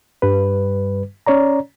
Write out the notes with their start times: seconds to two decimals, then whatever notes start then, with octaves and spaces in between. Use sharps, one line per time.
0.22 G2 G3 B4
1.26 C#4 C#5 D5 A#5